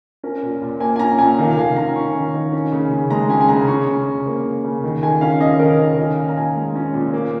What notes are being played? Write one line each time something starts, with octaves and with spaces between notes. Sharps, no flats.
C#4 A#4
A#2
A#2
A#3 G#5
G#5
C#4 A#5
A#2 G#5
D#3 F5
F5
D#3 G#5
C#4 A#5
C#4 C#6
D#3
D#3
C#4
C#3
C#3
G#3 A#5
C#4 G#5
G#5
C#3 A#5
C#4 C#6
C#3
C#3
A#3
C#4
C#3
D#3
D#3 G#5
C#4 F5
C#4 D#5
D#3 A#4
D#3 A#4
C#4 D#5
A#2 F5
A#5
A#2 G#5
G#3
C#4
A#2
A#3